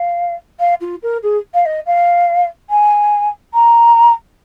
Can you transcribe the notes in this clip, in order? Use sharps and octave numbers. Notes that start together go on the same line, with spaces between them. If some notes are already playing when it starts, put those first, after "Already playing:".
Already playing: F5
F5
F4
A#4
G#4
F5
D#5
F5
G#5
A#5